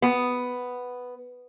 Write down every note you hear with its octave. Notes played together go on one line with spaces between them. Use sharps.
B3